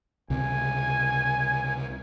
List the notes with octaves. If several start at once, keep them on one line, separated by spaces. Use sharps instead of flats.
C#2 C3 G#5